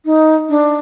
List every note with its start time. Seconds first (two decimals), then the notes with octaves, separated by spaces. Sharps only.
0.05 D#4
0.49 D4